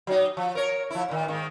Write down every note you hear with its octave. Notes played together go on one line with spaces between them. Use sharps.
F#3 D#4
F3
A#4 C#5
F3 E4
A#2 D#3
G#2 D#3 A#3